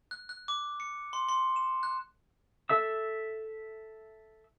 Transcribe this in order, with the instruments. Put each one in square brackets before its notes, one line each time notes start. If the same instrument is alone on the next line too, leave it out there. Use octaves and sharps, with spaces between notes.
[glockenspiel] F#6
F#6
D6
C#7
C6
C6
E7
F#6
[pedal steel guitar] A4 E5 E6